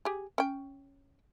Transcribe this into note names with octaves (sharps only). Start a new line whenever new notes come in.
G4 G#4
C#4 G5